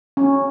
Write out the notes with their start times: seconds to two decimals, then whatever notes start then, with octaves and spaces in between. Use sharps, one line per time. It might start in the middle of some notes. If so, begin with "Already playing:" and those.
0.17 C#4